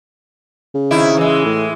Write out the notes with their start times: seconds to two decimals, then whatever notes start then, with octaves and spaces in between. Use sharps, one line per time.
0.74 C#3
0.91 C3 D#3 E4
1.17 E3 G#3
1.45 A2